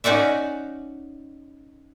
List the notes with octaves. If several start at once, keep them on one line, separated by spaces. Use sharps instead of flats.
C#4 D#4 F#4 D5 E5